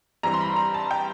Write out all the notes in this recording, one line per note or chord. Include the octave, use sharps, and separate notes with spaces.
G2 E3 G3 C4 A#5
C6
B5
A#5
A5
G5